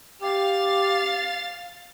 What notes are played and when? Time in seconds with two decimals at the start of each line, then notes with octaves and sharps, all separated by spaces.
0.21 G4 F5 A6